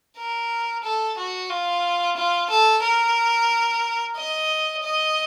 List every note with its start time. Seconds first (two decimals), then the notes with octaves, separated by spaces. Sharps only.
0.17 A#4
0.84 A4
1.17 F#4
1.50 F4
2.16 F4
2.50 A4
2.83 A#4
4.16 D#5
4.82 D#5